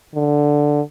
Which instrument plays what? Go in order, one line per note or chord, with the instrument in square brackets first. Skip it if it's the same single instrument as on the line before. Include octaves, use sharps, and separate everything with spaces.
[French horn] D3